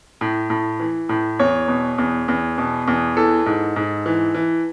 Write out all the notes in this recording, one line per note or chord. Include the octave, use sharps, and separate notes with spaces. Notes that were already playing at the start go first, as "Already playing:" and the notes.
A2
A2
E3
A2
E2 C#5
B2
E2
E2
B2
E2
E3 A4
G#2
G#2
E3
E3